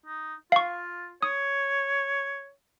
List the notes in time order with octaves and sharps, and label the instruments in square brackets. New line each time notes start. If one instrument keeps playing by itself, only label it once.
[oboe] D#4
[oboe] F4 [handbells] F5 C#6
[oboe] C#5 [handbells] D#6